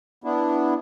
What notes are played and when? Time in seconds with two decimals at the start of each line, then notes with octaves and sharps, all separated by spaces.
0.24 B3 D4 E4